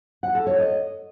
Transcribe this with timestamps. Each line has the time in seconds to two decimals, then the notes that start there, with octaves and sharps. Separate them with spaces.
0.23 F#5
0.35 A4
0.47 C#5
0.58 D#5